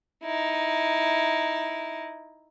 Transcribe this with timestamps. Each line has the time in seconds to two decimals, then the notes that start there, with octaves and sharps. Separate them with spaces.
0.23 D#4 E4